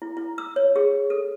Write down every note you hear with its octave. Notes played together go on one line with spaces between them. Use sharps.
E4
E4
E6
C#5
G#4
A4